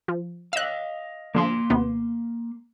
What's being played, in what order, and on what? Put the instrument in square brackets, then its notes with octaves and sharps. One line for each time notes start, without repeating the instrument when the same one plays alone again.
[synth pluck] F3
[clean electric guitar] D#5 F5 [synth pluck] E6 F#6
[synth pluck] D3 F3 [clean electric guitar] A#3 C6
[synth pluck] D#2 C3 B3